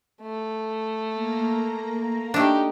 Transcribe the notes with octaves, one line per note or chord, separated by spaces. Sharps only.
A3
A#3 A#5
A3 D4 D#4 G4